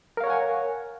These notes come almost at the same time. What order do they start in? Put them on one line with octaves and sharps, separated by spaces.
A#4 F5 C#5 F#5 G#5